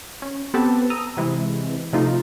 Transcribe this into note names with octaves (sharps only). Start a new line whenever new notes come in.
C#4
B3 C4 G4 A4 B4 A5
A#5 D#6 E6
C3 E3 G#3
C3 F3 A3 D#4 F4